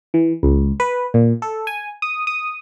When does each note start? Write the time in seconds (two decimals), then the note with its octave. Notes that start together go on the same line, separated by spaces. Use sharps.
0.14 E3
0.43 C#2
0.80 B4
1.14 A#2
1.42 A4
1.67 G#5
2.02 D#6
2.27 D#6